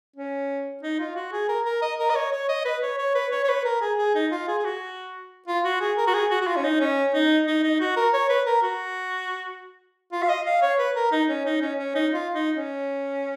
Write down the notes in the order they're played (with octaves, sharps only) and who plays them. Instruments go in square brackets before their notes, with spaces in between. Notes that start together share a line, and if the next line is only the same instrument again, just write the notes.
[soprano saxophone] C#4
D#4
F4
F#4
G#4
A#4
A#4
D#5
A#4
D#5
C#5
C#5
D#5
B4
C#5
C#5
B4
C#5
C#5
B4
A#4
G#4
G#4
D#4
F4
G#4
G#4
F#4
F4
F#4
G#4
A#4
F#4
G#4
F#4
F#4
F4
C#4
D#4
C#4
D#4
D#4
D#4
F#4
A#4
C#5
B4
A#4
F#4
F4
F5
D#5
F5
C#5
B4
A#4
D#4
C#4
D#4
C#4
C#4
D#4
F4
D#4
C#4